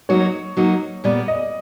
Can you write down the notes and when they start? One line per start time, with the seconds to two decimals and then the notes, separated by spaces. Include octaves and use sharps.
0.09 F#3 A#3 D#4 F#4 C#5
0.57 F#3 A#3 D#4 F#4
1.04 A#2 G3 B3 D5
1.28 D#5